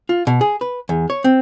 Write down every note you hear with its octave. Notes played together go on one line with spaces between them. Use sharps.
F4
B2
G#4
B4
E2
C#5
C4